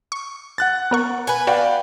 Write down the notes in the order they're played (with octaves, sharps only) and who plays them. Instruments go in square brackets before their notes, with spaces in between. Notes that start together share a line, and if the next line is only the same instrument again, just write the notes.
[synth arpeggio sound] C#6
[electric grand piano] F#5 F#6 A6
[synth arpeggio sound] B3 A#4 C#6
[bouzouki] B4 G#5
[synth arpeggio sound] F#4 [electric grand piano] D5 F5 G5